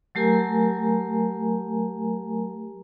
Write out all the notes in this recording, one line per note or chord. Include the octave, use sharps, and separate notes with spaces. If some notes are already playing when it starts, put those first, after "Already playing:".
F#3 A3 G4 A#4 G#5 A#5